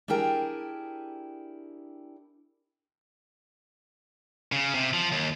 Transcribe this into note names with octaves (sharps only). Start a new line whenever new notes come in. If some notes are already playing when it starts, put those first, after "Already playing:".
D4 E4 G4 G#4 A#4 G5
C#3
C3
F3
D#2